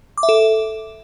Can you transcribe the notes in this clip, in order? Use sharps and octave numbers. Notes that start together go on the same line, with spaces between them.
D6
E5
A4